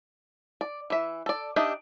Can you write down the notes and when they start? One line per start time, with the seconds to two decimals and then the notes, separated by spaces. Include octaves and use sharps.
0.61 D5
0.90 E3 E5
1.26 A4 D5
1.56 D4 D#4 G4 D#5 E5